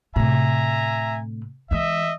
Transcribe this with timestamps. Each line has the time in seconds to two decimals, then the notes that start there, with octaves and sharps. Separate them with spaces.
0.16 A2 C3 E5 G#5 A#5
1.71 E3 G#3 D#5 E5